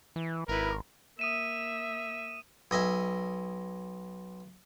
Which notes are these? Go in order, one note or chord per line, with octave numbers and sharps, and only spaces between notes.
E3
G#1 E4 A#4 B4
A#3 E5 D#6 D#7 E7
B1 D#5 E5 G#5